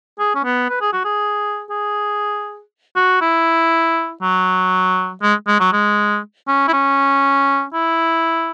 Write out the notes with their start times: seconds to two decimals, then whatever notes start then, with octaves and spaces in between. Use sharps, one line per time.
0.19 G#4
0.35 C#4
0.44 B3
0.69 B4
0.81 G#4
0.93 F#4
1.05 G#4
1.71 G#4
2.96 F#4
3.21 E4
4.22 F#3
5.22 G#3
5.48 G#3
5.60 F#3
5.72 G#3
6.48 C#4
6.68 E4
6.73 C#4
7.74 E4